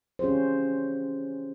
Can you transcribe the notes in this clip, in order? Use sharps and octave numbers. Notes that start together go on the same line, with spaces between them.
C#4 F4 G4 G#4 C5
E3